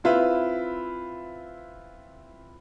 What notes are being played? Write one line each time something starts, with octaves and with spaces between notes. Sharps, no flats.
C4 E4 F4 B4 E5 B5